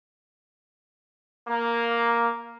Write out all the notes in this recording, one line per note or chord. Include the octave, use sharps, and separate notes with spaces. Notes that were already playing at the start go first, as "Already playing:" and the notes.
A#3